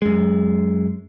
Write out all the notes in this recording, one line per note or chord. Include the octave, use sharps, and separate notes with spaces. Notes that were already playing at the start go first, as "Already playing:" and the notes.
F#2 G#3